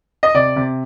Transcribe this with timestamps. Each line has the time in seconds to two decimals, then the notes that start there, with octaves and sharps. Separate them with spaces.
0.23 D#5
0.34 C3 D5
0.56 C3